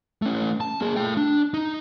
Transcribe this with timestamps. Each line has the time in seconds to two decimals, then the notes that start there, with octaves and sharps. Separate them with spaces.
0.22 A3 C#4
0.61 A5
0.81 A#3 G#4
0.96 A3 G5
1.17 D4
1.54 D#4